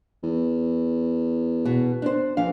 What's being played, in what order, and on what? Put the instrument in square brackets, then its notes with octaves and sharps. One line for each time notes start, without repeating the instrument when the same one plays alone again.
[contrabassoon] E2
[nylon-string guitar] B2
D4 C5
[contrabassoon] A#1 [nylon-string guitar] E3 F5